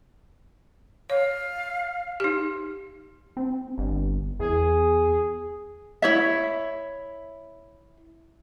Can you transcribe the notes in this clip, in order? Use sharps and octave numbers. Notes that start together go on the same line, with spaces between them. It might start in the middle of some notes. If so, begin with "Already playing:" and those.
C#5 F5
D#4 G4
C4
G1
E2 G#4
E4 C#5 E5